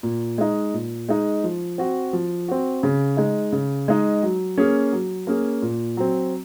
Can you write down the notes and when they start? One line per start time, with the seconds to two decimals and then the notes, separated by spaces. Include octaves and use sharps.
0.03 A#2
0.38 G#3 D#4
0.74 A#2
1.09 G#3 D#4
1.44 F3
1.78 C4 F#4
2.13 F3
2.48 C4 F#4
2.83 C#3
3.17 G#3 D#4
3.52 C#3
3.88 G#3 D#4
4.23 F#3
4.58 A#3 C#4 G#4
4.93 F#3
5.27 A#3 C#4 G#4
5.62 A#2
5.97 F#3 C4